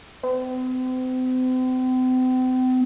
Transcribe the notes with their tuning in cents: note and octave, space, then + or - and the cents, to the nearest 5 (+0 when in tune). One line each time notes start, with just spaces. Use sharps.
C4 -40